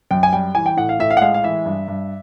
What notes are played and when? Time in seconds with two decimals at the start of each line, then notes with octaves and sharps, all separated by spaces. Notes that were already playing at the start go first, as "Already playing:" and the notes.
0.11 F#2 G5
0.23 G#5
0.33 G3 G5
0.55 E3 G#5
0.66 G5
0.77 A2 F#5
0.89 F5
0.99 A2 E5
1.10 F5
1.17 F#5
1.21 G#3 F5
1.34 F5
1.44 E3 E5
1.66 G2
1.88 G2